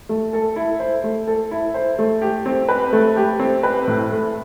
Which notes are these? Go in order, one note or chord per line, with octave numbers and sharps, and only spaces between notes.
A3
A4
E4
C5
A3
A4
E4
C5
A3
G4
C4
B4
A3
G4
C4
B4
A2
A3